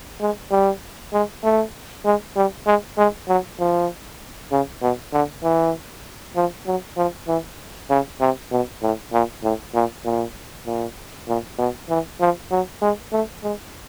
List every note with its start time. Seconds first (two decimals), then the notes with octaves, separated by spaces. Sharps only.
0.20 G#3
0.51 G3
1.13 G#3
1.43 A3
2.05 G#3
2.36 G3
2.66 G#3
2.97 G#3
3.28 F#3
3.59 F3
4.51 C#3
4.82 B2
5.13 D3
5.43 E3
6.36 F3
6.66 F#3
6.97 F3
7.28 E3
7.90 C#3
8.20 C3
8.51 B2
8.82 A2
9.13 A#2
9.43 A2
9.74 A#2
10.05 A#2
10.66 A#2
11.28 A#2
11.58 B2
11.89 E3
12.20 F3
12.51 F#3
12.82 G#3
13.12 A3
13.43 G#3